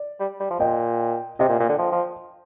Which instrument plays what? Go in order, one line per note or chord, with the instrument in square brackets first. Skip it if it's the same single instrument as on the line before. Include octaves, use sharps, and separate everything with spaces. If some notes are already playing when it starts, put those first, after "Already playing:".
Already playing: [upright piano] D5
[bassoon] G3
G3
F3
[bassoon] A#2 [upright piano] D#5 G5
[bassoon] C3 [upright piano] D#5 G5
[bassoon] A#2
A#2
D3
F3
F3